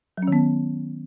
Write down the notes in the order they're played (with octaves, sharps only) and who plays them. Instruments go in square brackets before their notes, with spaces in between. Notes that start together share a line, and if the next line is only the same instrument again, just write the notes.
[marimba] F#3
C#4
D#3
B3